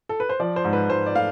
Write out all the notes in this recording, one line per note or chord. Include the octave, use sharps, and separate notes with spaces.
A4
B4
C5
F3 D5
C5
G#2
B4
G#2 C5
D5
A3 F5